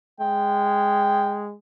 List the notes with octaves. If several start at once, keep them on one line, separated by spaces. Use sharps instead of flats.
G#3 G5